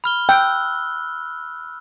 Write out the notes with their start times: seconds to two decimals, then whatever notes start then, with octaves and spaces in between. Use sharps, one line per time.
0.04 B5 F6 G7
0.29 G5 E6 F#6